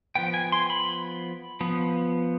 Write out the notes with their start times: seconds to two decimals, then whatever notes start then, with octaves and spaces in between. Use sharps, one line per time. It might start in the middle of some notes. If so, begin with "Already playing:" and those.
0.15 F3 B3 G5
0.34 G#5
0.52 C6
0.70 B5
1.61 F3 B3